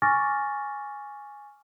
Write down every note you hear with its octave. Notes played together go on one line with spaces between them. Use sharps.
G#5 C#6 D6 F6 A6 A#6